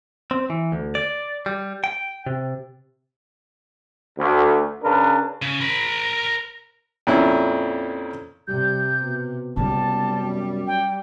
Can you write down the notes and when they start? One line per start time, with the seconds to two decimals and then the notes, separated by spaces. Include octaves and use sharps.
0.31 C4
0.50 E3
0.72 D2
0.95 D5
1.46 G3
1.84 G5
2.26 C3
4.18 D2
4.83 C#3 D4 A#4 B4
5.42 C#3
5.61 A#4 B5
7.07 F2 A#2 C#4 E4
8.48 C3 G3 G6
9.01 B2
9.56 F#1 C3 G3 B3 A5
10.14 F#2
10.67 G5